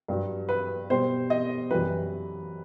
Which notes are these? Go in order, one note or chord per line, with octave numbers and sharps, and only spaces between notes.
G2 F#3
B4
B2 G3 C5
D#5
F#2 E3 G3 B4